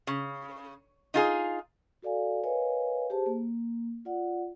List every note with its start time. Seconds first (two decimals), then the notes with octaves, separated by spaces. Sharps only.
0.07 C#3
1.14 D#4 F4 G#4
2.02 F#4 A4 D5 F5 G#5
2.44 A#4 B4 C#5 D#5 F5 G#5
3.10 G4 G#4 C5 A5
3.26 A#3
4.05 F4 D5 F#5